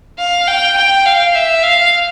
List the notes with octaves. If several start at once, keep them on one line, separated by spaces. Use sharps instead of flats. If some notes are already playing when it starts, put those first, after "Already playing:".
F5
G5
G5
F5
E5
F5